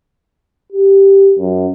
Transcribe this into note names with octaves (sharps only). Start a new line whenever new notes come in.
G4
F#2